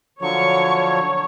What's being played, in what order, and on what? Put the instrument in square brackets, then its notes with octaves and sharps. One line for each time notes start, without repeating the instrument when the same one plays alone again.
[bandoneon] D3 F3 F#3 [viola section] C#5 [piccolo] C#6